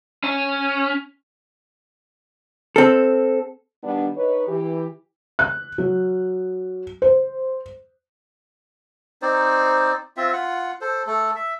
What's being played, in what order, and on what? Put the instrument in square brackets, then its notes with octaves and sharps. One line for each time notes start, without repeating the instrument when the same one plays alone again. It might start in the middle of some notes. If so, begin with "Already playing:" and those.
[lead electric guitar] C#4
[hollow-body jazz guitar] C4 A4
[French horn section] D#3 G3 B3 D4
D#4 B4 C#5
E3 G4
[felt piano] F#6
F#3
C5
[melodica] C4 D#4 C5 D5
C4 F4 E5
F4 F#5
A4 C5
A3 A4
E5